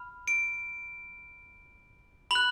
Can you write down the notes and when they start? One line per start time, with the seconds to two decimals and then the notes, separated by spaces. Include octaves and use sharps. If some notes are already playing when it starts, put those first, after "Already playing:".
Already playing: B5 F6
0.28 D7
2.31 B5 F#6 F#7